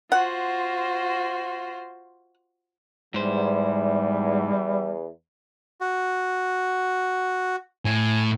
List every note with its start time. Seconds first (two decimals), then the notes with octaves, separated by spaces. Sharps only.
0.12 F4 F#4 C5 F#5
3.14 E2 G#2 G3 C5
5.81 F#4
7.85 A2 G#5